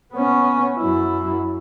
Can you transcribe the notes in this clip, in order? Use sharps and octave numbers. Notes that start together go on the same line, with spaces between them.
B3 C#4
F#2 E4